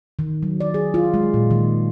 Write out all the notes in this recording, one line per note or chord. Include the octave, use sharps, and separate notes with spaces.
D#3
F#3
D5
G#4
F4
G#3
A#2
D#3